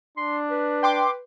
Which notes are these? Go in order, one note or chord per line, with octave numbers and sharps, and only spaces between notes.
D4 C6
B4
G5 C6 D6